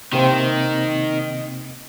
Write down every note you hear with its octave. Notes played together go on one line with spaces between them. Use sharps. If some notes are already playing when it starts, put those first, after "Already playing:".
C3 D#3 A#3 C4